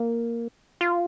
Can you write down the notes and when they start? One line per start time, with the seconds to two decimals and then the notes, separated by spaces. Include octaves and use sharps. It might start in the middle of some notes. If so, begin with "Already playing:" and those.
Already playing: A#3
0.81 F4